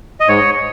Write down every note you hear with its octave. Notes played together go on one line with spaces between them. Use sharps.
D#5
G#2 C#5